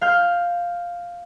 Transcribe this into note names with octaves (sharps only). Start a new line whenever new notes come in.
F5 F6 G6